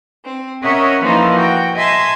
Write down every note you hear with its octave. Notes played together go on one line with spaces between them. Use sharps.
C4
C#4 A#4 C#5 D#5 E5 F#5
E3 F3 A#3 D#4 F4 A4
F#4 G5
D#5 E5 G#5 A5 C6 E6